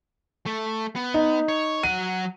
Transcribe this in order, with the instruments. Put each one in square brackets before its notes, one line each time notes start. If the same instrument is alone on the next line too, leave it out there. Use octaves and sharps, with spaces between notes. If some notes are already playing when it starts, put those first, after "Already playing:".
[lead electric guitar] A3
B3
[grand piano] D#4
[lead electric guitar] C#5
[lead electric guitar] F#3 F#5 [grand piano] D#7